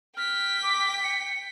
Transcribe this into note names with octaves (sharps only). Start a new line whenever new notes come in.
G5 F6 B6
D6
C#7